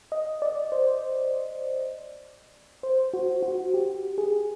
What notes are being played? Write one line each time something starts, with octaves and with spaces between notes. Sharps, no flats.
D#5
D5
C5
C5
F#4
F#4
G4
G#4